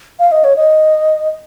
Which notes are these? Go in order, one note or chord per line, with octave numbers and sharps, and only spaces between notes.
F5
D#5
C#5
D#5